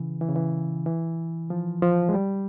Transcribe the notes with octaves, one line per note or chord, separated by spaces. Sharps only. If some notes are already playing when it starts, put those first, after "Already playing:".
Already playing: C#3 E3
E3
C#3
E3
E3
F3
F3
G#3
G3